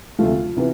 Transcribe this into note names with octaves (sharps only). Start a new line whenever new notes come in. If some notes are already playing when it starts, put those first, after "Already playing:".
D2 C3 F3 A3 F4
C3 E3 B3